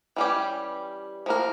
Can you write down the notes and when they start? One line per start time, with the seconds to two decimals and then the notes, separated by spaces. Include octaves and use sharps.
0.16 E3 G3 C#4 G4
1.26 F3 A#3 E4 A#4